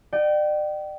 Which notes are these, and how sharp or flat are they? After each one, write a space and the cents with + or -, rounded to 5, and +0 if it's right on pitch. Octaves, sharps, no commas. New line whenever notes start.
D5 +40 G5 -30